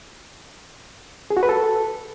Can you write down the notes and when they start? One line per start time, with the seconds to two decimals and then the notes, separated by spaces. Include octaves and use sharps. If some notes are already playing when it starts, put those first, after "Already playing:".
1.30 G#4
1.37 F#4
1.43 B4
1.49 A4